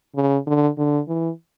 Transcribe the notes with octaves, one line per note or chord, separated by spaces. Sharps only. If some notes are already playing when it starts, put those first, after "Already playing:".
C#3
D3
D3
E3